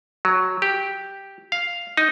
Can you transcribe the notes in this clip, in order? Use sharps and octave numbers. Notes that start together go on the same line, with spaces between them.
F#3
G4
F5
D#4